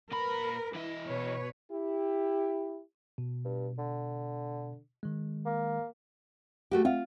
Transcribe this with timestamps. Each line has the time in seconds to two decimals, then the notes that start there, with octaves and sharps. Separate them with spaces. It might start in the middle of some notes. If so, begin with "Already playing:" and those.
0.12 A#2 A#4 B4 B5
0.74 E3 E4 D#5
1.07 B2 B4 C#5
1.72 E4 G4
3.18 B2
3.45 G2
3.78 D3
5.03 D#3 G#3
5.46 A#3
6.71 A3 F#4 G4
6.85 C4 F4 E5 F#5